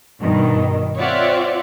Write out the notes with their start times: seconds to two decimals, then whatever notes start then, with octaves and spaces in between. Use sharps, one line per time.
0.22 G2 B2 D#3
0.99 C4 F4 C#5 D5 E5 F#5